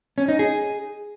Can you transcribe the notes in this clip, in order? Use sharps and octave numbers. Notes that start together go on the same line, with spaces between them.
C#4
D#4
G#4